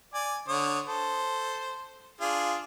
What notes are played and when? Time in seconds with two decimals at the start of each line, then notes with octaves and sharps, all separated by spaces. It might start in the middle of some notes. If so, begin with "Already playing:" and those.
0.14 D5 G#5
0.48 D3 C#5 D#6
0.86 A4 C5
2.21 D4 F4 G#4